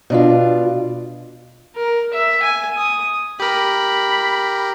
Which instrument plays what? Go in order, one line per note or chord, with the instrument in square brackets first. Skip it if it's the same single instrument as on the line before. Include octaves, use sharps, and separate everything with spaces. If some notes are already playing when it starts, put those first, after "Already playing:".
[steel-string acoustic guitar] B2 D4 F4
[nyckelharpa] A#4
E5
G#5
D#6
[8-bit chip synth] G4 A#4 [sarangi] B5